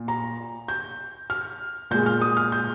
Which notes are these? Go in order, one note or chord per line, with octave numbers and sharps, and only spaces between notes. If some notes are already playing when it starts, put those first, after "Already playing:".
Already playing: A#2
A#5
G6
F6
A#2 G#3 G6
F6
D#6
F6
G6